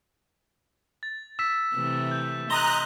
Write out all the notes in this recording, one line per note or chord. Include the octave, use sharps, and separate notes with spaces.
A6
E6 B6 E7
C3 E3 A3
G6
D#5 A#5 C6 D#6 F#6 G7